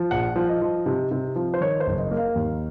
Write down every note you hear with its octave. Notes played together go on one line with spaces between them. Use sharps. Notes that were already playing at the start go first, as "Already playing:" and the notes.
Already playing: F3
A#1 F#5
F3
D#5
F3
C3
C3
F3
C5
D#3 C#5
C5
F#1
D#5
A#3
F5
D#2